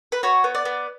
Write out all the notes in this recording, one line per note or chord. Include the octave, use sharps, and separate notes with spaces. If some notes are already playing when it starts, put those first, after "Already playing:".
B4
F#4 C#5
B3
D5
B3